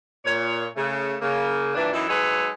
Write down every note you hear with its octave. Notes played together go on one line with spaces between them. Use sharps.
A#2 C#5
C#3 A3
C#3 A#3
G2 A#2 E3 D4
F#2 E3 D#4 E4
F#3 G#3 D#4 A4 B4 C#5